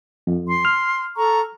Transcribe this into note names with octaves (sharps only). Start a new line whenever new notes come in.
F2
C6
F6
A4 A#5 C#6